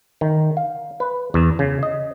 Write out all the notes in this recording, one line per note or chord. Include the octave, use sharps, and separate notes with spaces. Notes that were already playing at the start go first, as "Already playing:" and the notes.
D#3
F5
B4
E2
C#3
D#5